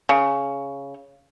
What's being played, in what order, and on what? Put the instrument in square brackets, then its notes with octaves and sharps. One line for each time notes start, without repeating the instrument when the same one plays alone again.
[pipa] C#3